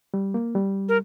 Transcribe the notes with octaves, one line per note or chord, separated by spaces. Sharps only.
G3
A#3
G3
A#4